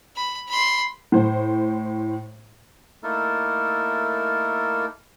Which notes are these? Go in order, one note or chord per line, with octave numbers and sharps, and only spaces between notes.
B5
B5 C6
A2 C5
A3 A#3 D#4 E4 A4 A#4